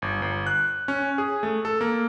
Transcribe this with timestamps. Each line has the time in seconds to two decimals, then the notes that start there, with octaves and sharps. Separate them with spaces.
0.02 G1
0.22 G1
0.47 F#6
0.88 C#4
1.18 G#4
1.43 A3
1.65 A4
1.81 A#3